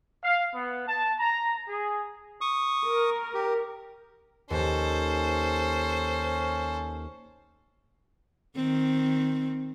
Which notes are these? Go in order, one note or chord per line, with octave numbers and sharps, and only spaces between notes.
F5
B3
A5
A#5
G#4
C#6 D#6
A#4
G4
D#2 C#4 A4 C5
D#3 C4